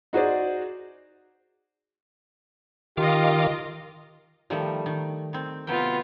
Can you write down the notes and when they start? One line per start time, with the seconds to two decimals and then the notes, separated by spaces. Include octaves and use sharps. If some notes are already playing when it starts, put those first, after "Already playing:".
0.13 D#4 F#4 G#4 C5 D5
2.97 D#3 F4 G4 D#5 F5 D6
4.50 D#3 F3 G3 A3
4.86 D#3
5.33 D#3 C4
5.67 C3 F#3 B3 F4 G5